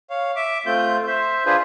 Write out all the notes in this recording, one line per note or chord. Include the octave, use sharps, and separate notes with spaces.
C#5 F5
E5 D6
A3 C4 F4 G6
C5 E5
D4 F4 G#4 B4 C5